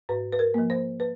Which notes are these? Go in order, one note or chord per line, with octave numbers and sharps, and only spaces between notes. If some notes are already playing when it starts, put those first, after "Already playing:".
G#2 B4
B4
A#4
F3 A#3
C5
B4